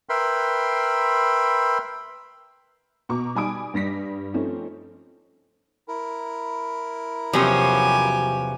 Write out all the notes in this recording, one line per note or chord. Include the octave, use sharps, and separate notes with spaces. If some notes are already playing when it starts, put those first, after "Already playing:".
A#4 B4 E5 G5 B5 C6
B2 A#5 C#6 D6
G3 D#4 G#5 B5 D#6 D7
G2 G3 A#6 B6
F3 A3 C4 C#4 D#4
E4 A#4
E2 C3 F3 F#3 C#4 F#4 G4 G#5